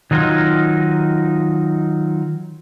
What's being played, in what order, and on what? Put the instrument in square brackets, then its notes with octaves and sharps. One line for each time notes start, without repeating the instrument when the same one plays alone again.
[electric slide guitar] D#3 F#3 D#4 F4